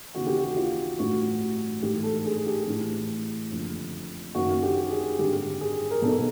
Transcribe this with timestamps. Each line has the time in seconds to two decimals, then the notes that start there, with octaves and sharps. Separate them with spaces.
0.14 D#2 C#3 E3 F#4
0.27 G4
0.37 F#4
0.57 F4
0.99 A1 G2 E3 F#4
1.82 A1 G#2 E3 G4
2.03 A4
2.25 G#4
2.46 G4
2.67 A1 A2 E3
3.51 F#1 F2 D3
4.35 F#1 F#2 D#3 F#4
4.63 G4
4.91 G#4
5.18 G#1 G2 D3 G4
5.61 G#4
5.91 A#4
6.02 B1 B2 A4